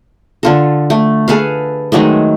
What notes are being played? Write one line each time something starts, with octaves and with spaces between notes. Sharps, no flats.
D3 F4 A4
A3
G#4 A4 B4 F5
D#3 F#3 G#3 A3